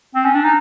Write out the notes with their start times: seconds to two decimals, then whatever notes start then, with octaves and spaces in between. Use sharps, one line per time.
0.15 C4
0.25 C#4
0.35 D4
0.44 D#4